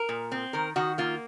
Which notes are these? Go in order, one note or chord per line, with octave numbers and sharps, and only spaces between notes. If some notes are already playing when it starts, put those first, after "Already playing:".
Already playing: A#4
A#2
C4
D#3 A#4
D#3 F#4
A#3 F4